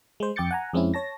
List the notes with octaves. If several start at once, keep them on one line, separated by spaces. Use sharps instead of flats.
G#3 C5
F2 G5 D6 G6 A6 C#7
F#5 G#5 A#5
F2 G#3 C4 C#4 E4
C#5 A5 A#6